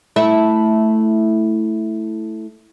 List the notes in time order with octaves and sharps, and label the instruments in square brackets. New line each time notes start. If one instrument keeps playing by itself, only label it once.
[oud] A3 E4 E5